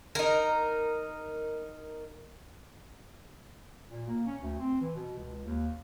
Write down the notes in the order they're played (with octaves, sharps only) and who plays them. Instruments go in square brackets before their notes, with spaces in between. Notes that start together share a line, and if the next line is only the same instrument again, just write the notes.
[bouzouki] D#4 A#4
[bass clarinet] A#2
A#3
C#4
D2
C4
E3
B2
C#2
D#2